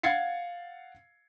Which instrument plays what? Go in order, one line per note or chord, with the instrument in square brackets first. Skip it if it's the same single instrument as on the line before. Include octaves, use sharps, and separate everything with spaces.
[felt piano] F5 F#5 G#6 A6 C7 C#7